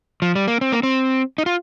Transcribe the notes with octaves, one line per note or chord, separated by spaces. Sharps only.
F3
G3
A#3
C4
A#3
C4
D#4
F4